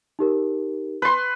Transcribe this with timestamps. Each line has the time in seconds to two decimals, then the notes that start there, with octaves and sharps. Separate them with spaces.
0.19 D#4 G4 A#4
1.02 B4 C6